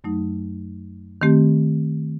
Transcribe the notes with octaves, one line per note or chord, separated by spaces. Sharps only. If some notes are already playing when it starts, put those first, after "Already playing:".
F#2 F#3 A3 D#4
D#3 A3 C4 G4